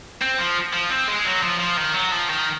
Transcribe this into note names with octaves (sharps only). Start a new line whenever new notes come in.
C4
F3
F3
C4
G#3
F#3
F3
F3
D#3
F#3
F3
D#3